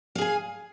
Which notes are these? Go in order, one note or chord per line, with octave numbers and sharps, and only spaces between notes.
G#4 F5 G#5